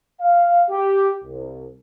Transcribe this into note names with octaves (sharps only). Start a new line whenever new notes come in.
F5
G4
C2